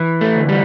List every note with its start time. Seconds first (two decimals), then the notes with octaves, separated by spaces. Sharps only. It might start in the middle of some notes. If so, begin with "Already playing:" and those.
Already playing: E3
0.21 A3
0.35 D2
0.49 G3